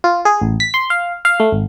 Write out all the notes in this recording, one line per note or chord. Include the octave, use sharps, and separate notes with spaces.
F4
G#4
A1
B6
C6
F5
F5
A3
G#1